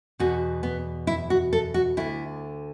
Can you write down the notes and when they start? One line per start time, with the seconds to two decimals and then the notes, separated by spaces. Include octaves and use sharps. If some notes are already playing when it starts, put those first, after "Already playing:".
0.19 E2 B2 F#4
0.63 B3
1.07 E4
1.30 F#4
1.53 A4
1.74 F#4
1.97 D2 D3 E4